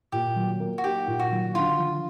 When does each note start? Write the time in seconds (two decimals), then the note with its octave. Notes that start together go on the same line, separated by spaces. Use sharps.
0.12 A#2 G4
0.36 F#3
0.60 A#3
0.78 F#4
0.84 D#4 G4
1.08 A#2
1.19 F#4
1.32 F#3
1.55 D3 F4
1.79 F3